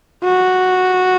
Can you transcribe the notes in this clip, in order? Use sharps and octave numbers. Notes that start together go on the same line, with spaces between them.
F#4